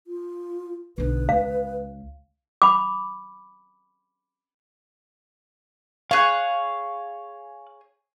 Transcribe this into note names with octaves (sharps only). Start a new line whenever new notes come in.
F4
B1 D3 B4
C#2 F5
B5 D6
G#4 C#5 F5 F#6